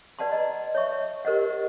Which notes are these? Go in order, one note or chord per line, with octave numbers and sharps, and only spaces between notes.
B4 D5 F#5 A5 C6
D#5 A#5
C#5 E5 C#6
G4 A#4 C5 D#5 F#5